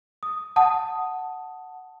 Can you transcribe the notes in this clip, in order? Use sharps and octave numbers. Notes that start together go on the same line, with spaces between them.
D#6
F#5 A5 D#6